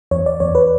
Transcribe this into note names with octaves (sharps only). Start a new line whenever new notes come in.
E2 C#5
D5
E2 C#5
B4